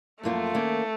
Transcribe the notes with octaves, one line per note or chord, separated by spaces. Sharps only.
F#2 F3 A3 A#3 F4
D#3 A#3 C#4